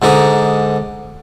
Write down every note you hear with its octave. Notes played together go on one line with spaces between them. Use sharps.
G#2 D3 D#4